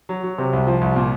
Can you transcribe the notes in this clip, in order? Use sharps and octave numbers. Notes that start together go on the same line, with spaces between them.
F#3
F#3
C3
C2
F3
C2
A#2